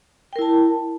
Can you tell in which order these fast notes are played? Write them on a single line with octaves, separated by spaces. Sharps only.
G5 A#4 E4 A5